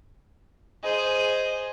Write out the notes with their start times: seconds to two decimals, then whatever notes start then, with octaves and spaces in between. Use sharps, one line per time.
0.83 G#4 C5 D#5